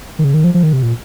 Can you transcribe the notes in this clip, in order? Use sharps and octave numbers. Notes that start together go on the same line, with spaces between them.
D#3
C#3
D#3
F3
F3
D#3
C3
A#2